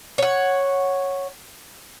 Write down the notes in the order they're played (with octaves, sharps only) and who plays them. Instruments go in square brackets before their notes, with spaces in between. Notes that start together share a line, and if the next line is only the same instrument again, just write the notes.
[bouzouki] C#5 F#5